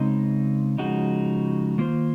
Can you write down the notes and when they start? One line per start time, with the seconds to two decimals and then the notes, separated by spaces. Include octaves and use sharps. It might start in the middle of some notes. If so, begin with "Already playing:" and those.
Already playing: C#3 G#3 C4 D#4
0.78 C#3 F3 G#3 D#4 F#4
1.78 D#3 A#3 F4 C5